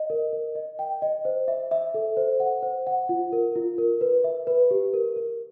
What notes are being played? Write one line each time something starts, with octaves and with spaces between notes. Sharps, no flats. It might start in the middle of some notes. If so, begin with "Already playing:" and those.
Already playing: D#5
A#4
A#4
D#5
G5
D#5
C5
E5
E5
A4
C5
F#5
C5
F#5
F4
A#4
F4
A#4
B4
E5
B4
G4
A#4
A#4